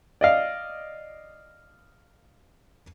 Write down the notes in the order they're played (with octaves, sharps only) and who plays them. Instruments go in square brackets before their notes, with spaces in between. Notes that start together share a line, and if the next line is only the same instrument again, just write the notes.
[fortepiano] D5 D#5 F5